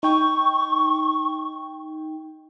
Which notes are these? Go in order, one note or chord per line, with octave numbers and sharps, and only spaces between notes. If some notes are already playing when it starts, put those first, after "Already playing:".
D#4 G5 C#6